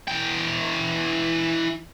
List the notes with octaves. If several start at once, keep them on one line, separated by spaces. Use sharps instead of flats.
E3 G5